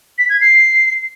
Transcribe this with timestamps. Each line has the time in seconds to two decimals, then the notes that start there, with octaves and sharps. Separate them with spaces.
0.18 B6
0.30 G#6
0.41 C7